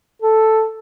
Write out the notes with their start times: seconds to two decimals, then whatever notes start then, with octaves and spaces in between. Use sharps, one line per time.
0.22 A4